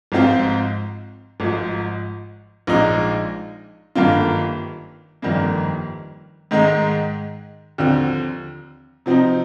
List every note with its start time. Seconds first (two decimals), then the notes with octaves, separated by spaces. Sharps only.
0.12 G#1 G#2 F3 C4 F4
1.40 G#1 G#2 F3
2.67 A#1 A#2 G#3 D#4
3.95 G1 G2 D#3 A#3 F4
5.22 G1 F2 D#3 G3 A#3
6.51 G#2 D#3 G#3 D#4
7.78 D#2 D3 F3 C4
9.06 C3 F3 C4 D#4